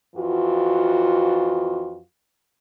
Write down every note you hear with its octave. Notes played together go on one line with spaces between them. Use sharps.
F2 E3 F4 F#4